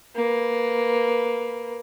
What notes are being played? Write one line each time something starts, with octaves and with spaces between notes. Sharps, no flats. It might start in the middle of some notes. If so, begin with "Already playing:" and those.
A#3 B4